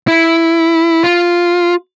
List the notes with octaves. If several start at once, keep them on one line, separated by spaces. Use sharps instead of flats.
E4
F4